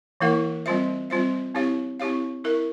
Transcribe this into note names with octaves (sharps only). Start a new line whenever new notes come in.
E3 A#3 E4 A#4 F5
G3 C4 F4 C5 E5
G3 C4 F4 C5 E5
C4 E4 G4 C#5 F5
C4 E4 G4 C#5 F5
E4 A#4 E5